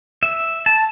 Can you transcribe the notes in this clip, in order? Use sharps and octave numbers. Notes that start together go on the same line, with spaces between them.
E5
A5